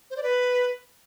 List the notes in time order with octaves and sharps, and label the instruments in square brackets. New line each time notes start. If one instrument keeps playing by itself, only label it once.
[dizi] C5
D5
B4